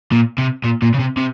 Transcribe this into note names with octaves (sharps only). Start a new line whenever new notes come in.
A#2
C3
A#2
A#2
C#3
C3
C3